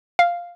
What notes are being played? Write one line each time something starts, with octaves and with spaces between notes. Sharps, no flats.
F5